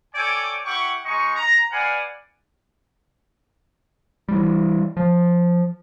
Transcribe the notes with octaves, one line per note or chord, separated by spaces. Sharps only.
A4 C#5 D5 G5 G#5 D6
E4 G4 F#5 G5 C#6
G#3 D#4 D#5 C#6
A#5
B4 D5 F5 F#5 G#5
E3 G3
F3